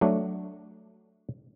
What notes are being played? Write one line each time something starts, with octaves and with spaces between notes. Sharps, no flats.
F#3 A3 D4